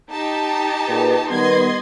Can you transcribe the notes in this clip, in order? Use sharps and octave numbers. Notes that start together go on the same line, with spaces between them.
D#4 G4 A5
A#2 G#4 B4
D#3 G3 B3 D#5 C6 G#6